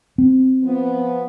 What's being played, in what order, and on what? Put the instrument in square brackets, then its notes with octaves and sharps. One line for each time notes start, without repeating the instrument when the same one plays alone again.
[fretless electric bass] C4
[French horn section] F3 B3